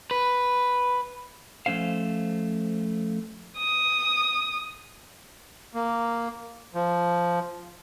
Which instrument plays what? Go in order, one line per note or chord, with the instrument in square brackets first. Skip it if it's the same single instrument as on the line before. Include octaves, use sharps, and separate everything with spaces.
[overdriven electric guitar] B4
[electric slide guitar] F3 A3 C#4 C5 F5
[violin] D#6
[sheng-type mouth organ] A#3
[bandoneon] F3